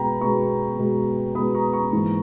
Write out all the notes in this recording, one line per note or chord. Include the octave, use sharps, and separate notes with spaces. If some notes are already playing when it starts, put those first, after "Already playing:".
Already playing: B2 G#3 B3 G5 A#5 B5
B2 G#3 B3 A#5 C#6
B2 G#3 B3
B2 G#3 B3 B5 D#6
A#5 C#6
A#5 C#6
G#2 E3 A#3